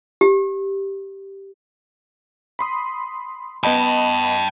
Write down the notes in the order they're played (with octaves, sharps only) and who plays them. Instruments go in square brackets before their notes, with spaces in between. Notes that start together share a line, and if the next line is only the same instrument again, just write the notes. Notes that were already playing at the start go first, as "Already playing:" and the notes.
[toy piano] G4
[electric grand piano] B5 C6 D#6
[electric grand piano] B3 D#5 B5 [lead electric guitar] G5 A5